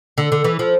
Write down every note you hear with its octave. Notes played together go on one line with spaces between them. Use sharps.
D3
D3
E3
F3